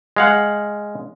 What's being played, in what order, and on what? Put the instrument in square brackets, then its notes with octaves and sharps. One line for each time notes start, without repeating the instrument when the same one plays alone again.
[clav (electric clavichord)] G#3 F5 F#5